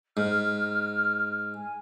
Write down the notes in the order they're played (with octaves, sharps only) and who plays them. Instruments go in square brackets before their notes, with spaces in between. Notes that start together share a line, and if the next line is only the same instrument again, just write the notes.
[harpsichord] G#2 [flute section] F6
[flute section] G#5